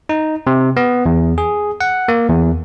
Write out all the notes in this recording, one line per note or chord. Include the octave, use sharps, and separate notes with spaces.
D#4
C3
B3
E2
G#4
F#5
A#3
E2